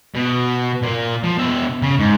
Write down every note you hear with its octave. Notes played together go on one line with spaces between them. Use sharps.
B2
A#2 A#3
F3
B2 E5
C#3
G#2